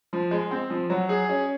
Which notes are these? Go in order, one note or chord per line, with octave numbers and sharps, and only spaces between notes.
F3
G#3
C4
F3
F#3
G#4
C#4